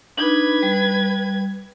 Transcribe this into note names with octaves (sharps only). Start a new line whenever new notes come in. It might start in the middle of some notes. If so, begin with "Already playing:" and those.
D4 D#4 B4 B5 G#6
G3